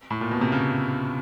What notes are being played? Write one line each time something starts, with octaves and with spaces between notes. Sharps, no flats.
A2
A#2
B2
C3
C#3